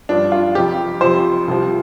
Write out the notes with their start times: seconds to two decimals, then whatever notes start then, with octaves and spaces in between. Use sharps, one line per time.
0.09 G2 F3 D4
0.32 F4
0.55 F2 C3 F3 G4
1.01 F2 C3 F3 C5
1.48 C2 C3 F3